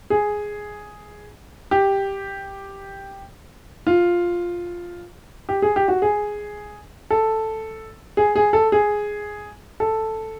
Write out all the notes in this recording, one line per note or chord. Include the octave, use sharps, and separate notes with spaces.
G#4
G4
F4
G4
G#4
G4
F#4
G#4
A4
G#4
G#4
A4
G#4
A4